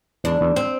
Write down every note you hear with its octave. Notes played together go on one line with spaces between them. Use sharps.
E2 D4
E2
C4